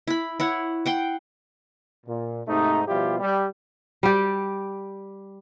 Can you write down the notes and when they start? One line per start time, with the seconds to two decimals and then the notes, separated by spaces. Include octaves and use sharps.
0.07 E4 B5
0.40 E4 C#5 F#5
0.86 F#5 G5 C6
2.06 A#2
2.48 G#2 C3 A3 D#4
2.87 B2 F3 G3 E4 F4 G4
3.19 G3
4.03 G3 G4